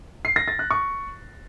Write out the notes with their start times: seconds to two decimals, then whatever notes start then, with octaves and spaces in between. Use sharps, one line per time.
0.25 C7
0.36 A#6
0.48 A6
0.59 F#6
0.71 C#6